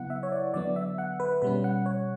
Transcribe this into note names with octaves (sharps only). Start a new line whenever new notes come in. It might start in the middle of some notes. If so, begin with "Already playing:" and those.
Already playing: C#3 F#3 B3 E4 F#5
E5
C#5
D5
D3 F#3 B3 D5
E5
F#5
B4
B2 G3 C#4 B4
F#5
C#5